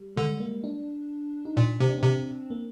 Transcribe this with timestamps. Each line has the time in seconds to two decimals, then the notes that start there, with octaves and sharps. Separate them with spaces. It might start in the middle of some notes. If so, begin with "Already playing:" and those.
Already playing: G3
0.16 D3 G#3
0.40 A#3
0.64 D4
1.45 D#4
1.56 A#2 D4
1.80 C3 C4
1.89 D4
1.98 C4
2.03 C3
2.50 A#3